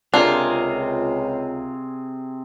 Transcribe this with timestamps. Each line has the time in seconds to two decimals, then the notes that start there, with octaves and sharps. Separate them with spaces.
0.14 C#2 C3 C4 D4 F4 G#4 A#4